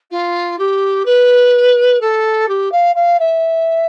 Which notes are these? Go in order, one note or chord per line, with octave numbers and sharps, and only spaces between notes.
F4
G4
B4
A4
G4
F5
F5
E5